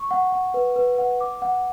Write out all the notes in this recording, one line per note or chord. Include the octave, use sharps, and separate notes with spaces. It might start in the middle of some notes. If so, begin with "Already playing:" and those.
Already playing: C#6
F#5
F#5
B4
B4
F#5
D6
F#5